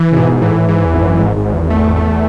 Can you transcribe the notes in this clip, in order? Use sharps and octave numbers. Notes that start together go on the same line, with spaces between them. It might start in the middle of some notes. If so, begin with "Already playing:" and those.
Already playing: E3
C#3
G#2 B2
A2 E3
G#2 E3
E2
G#1
F#2
G#1 G#2
G#2
G#1
E2
A3
A3